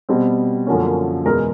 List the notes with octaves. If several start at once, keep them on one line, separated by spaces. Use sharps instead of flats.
B2 G3 C4
F#2 D3 F3 A#3 C#4
E2 B2 G#3 A#4